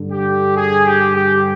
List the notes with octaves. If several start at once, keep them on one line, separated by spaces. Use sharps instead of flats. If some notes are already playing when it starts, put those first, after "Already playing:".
Already playing: G2 D3
G4
G#4
G4
G4